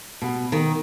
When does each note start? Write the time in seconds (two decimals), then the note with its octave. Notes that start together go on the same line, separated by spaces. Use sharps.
0.22 B2
0.52 D#3